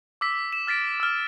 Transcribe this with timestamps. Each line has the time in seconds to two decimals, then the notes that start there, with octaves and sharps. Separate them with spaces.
0.21 D6 E6 B6
0.53 E7
0.67 F6 A6 B6 D7
1.00 E6 F6